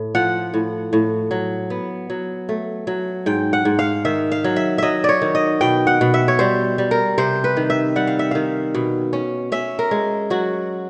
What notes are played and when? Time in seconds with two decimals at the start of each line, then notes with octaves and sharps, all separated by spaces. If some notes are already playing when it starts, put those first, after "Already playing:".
Already playing: A2
0.15 F3 F#5
0.54 A2
0.93 A2
1.31 F#3
1.70 B3
2.10 F#3
2.49 A3
2.87 F#3
3.26 G#2 G5
3.53 F#5
3.65 G#2
3.79 F5
4.05 D#3 E5
4.32 F5
4.44 F#3
4.56 E5
4.78 F#3 D#5 E5
5.04 C#5 D5
5.22 D#3
5.35 D#5
5.61 B2 G5
5.87 F#5
6.01 B2
6.14 E5
6.28 C#5
6.39 G3 C5
6.78 G3
6.91 A#4
7.18 C3 C5
7.44 B4
7.57 D#3
7.70 E5
7.96 G3 F#5
8.07 F5
8.19 E5
8.31 D#3 F5
8.75 B2
9.13 C#4
9.52 C#4 E5
9.79 A#4
9.91 G#3
10.30 F#3 F#4